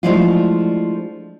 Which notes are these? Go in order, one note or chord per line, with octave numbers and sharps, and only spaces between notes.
F3 G#3 A3 D4 E4 F4